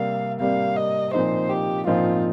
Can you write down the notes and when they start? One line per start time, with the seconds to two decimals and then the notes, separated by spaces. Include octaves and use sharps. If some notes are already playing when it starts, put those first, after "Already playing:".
Already playing: C3 G3 A#3 F5
0.40 C3 G3 A#3 F5
0.76 D#5
1.13 A#2 F3 C4 D#4 C5
1.50 G4
1.87 A#2 F3 C4 D#4 F4